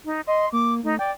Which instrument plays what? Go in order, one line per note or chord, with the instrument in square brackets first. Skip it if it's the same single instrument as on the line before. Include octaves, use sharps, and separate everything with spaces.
[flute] D#4
[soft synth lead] D#5 [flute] C6
[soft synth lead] A#3 [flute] D6
[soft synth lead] A3 [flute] D#4
[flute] D5 [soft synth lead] G5